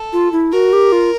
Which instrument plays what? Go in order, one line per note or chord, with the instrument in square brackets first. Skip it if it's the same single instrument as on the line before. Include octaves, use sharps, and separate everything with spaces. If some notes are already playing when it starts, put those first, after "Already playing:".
Already playing: [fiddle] A4
[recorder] F4
E4
[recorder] F#4 [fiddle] A#4
[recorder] G4
F4